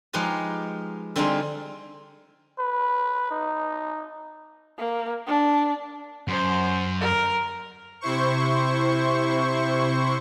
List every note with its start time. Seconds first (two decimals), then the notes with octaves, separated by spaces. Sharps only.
0.13 F3 G#3 D#4 G4 B4 A#5
1.16 D3 G3 C4 D#4 F4 G#4
2.59 B4
3.31 D#4
4.78 A#3
5.27 D4
6.28 F#2 C5
7.01 A#4
8.01 C3 E4 C5 C#6